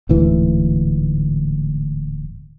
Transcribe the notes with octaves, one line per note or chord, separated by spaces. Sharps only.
D1 D2 G#2 E3